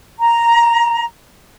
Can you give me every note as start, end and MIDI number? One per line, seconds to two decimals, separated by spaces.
0.20 1.05 82